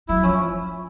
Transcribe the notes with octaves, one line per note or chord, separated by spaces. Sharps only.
F#3 E4
F3 C#4